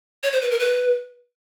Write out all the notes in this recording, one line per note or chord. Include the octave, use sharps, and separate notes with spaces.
C#5
C5
B4
A#4
B4